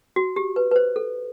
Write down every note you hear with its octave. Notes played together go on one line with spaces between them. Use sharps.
F#4
G4
B4
B4
C5
A4